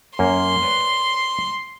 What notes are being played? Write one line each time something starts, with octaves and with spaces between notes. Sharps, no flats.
F#2 A#3 C#4 C6
B4 C#5 D5